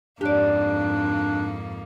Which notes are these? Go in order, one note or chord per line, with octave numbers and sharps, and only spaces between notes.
F2 G#2 A#3 D4 G4 D5